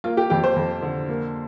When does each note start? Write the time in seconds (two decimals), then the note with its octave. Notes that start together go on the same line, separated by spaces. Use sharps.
0.04 A#3 F4
0.17 G4
0.30 F2 G4
0.44 C5
0.56 F2
0.82 D3
1.09 A#3